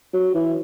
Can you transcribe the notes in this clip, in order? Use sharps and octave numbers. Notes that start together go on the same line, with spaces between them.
F#3
E3